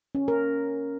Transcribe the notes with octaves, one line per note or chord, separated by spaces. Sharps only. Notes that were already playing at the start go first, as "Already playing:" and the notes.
C#4
A#4